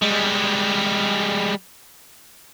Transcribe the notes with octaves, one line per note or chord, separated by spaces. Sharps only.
G3 G#3